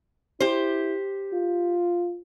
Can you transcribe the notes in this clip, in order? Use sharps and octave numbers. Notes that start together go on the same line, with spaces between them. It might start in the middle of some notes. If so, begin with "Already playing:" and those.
E4 G4 C5
F4